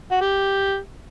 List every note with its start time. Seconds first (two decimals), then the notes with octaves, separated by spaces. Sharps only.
0.11 F#4
0.21 G4